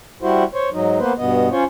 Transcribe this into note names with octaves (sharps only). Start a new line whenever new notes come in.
G3 E4 F#4 C5
C5 C#5
G#2 F#3 D#4
A#3 B3 B4 C5
G2 B2 B3 D#5
C#4 F4 C5 C#5